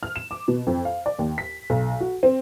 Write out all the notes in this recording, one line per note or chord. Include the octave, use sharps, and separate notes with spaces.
F6
E7
D6
B2
F2
F5
D5
D#2
B6
B1
F#4
C4